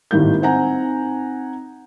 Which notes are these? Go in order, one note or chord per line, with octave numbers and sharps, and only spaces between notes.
G#1 A2 D#3 G3 A#3 G6
C4 D#4 F#5 G#5 A#5